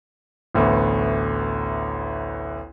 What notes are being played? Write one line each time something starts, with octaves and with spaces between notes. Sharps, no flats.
A1 D2 A3 B3